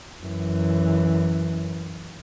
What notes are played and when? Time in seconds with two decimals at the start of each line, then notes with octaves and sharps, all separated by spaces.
0.23 F#2 E3